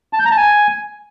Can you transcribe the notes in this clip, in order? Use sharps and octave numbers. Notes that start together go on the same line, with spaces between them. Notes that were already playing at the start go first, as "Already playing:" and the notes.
A5
G6
A#5
A5
G#5